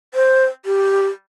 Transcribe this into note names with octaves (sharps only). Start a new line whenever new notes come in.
C5
G4